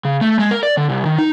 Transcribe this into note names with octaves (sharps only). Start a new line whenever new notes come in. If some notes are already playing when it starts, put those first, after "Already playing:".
C#3
A3
G#3
A#4
D5
D3
C2
D#3
D#4